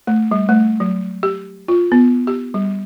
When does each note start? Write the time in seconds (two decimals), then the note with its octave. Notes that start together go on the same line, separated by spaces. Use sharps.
0.07 A3
0.31 G3
0.49 A3
0.80 F#3
1.23 G4
1.68 F4
1.92 B3
2.27 G4
2.54 G3